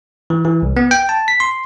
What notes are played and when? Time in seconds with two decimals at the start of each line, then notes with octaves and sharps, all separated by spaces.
0.30 E3
0.45 E3
0.62 C2
0.77 B3
0.91 G5
1.09 A5
1.28 B6
1.40 C6